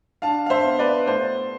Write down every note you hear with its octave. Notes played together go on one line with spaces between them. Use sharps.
D4 F5 A5
F5
C5 E5
B3
B4 D5
A2 C5